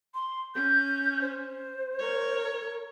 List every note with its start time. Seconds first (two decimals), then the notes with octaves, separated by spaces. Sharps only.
0.14 C6
0.55 C#4 G6
1.21 C5
1.99 A#4 C#5